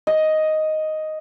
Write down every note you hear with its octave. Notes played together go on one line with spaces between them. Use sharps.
D#5